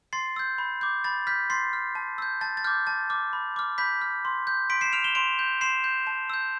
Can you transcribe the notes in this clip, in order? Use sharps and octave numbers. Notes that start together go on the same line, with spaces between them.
C6 A6 C7
E6 G6
B5
D6 G6
B5 A6
F6 G6 B6
C6 A6 C7
F6
A5
E6 G6
A5 A6
A6
D6 F6 G6
A5 A6
D6 F6
B5
D6 F6
B5 G6 B6
F6
C6
G6
C6 B6 D7
C7 E7
F6 D7 F7
E7 G7
C6 D7 F7
G6
C6 C7 E7
G6
A5
E6 G6